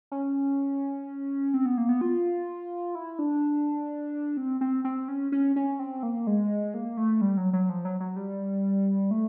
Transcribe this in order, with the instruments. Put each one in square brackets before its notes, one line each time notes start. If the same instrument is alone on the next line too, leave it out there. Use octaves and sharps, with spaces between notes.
[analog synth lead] C#4
C4
B3
A#3
B3
F4
E4
D4
C4
C4
C4
C#4
C#4
C#4
C4
A#3
G#3
A#3
A3
G3
F#3
F#3
F3
F#3
F#3
G3
A3